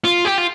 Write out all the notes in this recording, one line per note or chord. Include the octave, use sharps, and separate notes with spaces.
F4
G4
F4